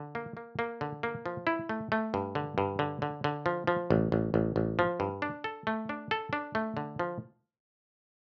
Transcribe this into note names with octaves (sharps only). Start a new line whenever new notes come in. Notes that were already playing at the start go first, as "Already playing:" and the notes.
Already playing: D3
A#3
A#3
A#3
D3
A#3
F3
E4
A3
A3
G2
D3
G2
D3
D3
D3
F3
F3
A1
A1
A1
A1
F3
G2
D4
A4
A3
D4
A4
D4
A3
D3
F3